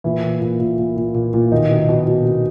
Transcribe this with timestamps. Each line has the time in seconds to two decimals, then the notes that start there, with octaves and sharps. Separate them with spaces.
0.04 A#2 E3 E4
0.23 A#2
0.41 A#2
0.59 A#2
0.78 A#2
0.97 A#2
1.15 A#2
1.34 A#2
1.52 B2 D#3 D#4
1.71 B2
1.89 B2
2.07 B2
2.25 B2